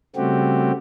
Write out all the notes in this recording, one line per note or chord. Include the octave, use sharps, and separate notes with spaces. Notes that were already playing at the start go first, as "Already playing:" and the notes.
C#3 G3 A3 C4 F#4 G4